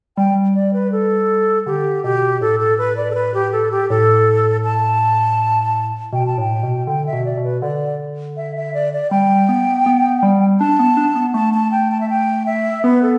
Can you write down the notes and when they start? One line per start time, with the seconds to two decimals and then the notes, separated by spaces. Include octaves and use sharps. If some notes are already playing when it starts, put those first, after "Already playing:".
0.17 G3 G5
0.54 D5
0.73 B4
0.92 A4
1.66 D3 G4
2.04 B2 G4
2.41 A2 A4
2.60 A4
2.78 B4
2.97 D5
3.11 A4
3.15 B4
3.34 G4
3.52 A4
3.71 G4
3.90 A2 A4
4.64 A5
6.13 B2 G5
6.26 A5
6.38 A2 G5
6.63 B2
6.87 D3 G5
7.07 E5
7.13 B2
7.25 D5
7.37 B2
7.44 B4
7.62 D3 D5
8.37 E5
8.56 E5
8.74 D5
8.93 D5
9.11 G3 G5
9.49 B3
9.86 B3
10.23 G3
10.60 D4 A5
10.79 B3
10.97 D4
11.15 B3
11.34 A3 A5
11.54 A5
11.72 G5
11.91 A5
12.01 E5
12.10 G5
12.46 E5
12.83 B3 B4
13.03 A4